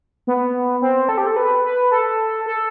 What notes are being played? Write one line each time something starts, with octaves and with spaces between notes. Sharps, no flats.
B3
C4
A4
G4
A4
B4
B4
A4
A4